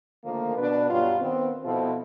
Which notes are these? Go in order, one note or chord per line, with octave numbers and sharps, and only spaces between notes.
D3 D#3 F3 A3 A#3
B2 D4 B4
G2 B2 F#3 G3 F4
D#3 B3 C4
B2 F3 C4 E4 F4 A4